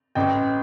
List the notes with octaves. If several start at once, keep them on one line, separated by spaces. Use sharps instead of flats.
A1 D#5 G5